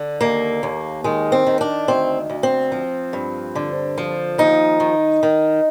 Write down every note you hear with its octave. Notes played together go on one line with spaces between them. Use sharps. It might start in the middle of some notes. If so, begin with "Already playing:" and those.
Already playing: D3
D#2 A#3
D#2
D#3 G#3
C4
D#3
D4
D2 C4
D2
C4
F3
G2
D3
F3
D#2 D#4
D#3
D#3